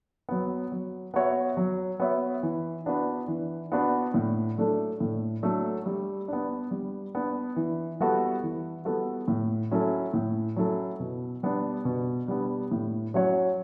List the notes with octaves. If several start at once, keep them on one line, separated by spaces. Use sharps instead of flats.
F#3 B3
F#3
B3 F#4 C#5 E5
F#3
B3 F#4 C#5 E5
E3
B3 D4 F#4 B4
E3
B3 D4 F#4 B4
A2
F#3 A3 D4 A4
A2
F#3 A3 D4 A4
G3
B3 D4
G3
B3 D4
E3
G3 B3 F#4 A4
E3
G3 B3 F#4 A4
A2
F#3 C#4 E4 A4
A2
F#3 C#4 E4 A4
B2
G3 B3 D4
B2
G3 B3 D4
A2
F#3 C#4 F#4 C#5